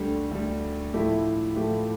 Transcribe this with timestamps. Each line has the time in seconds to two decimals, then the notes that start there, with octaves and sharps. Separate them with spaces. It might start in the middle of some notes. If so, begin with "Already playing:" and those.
Already playing: D2 D3 G3
0.31 D2 D3 G3
0.93 A2 F3 A3 E4 G4
1.55 A2 F3 A3 E4 G4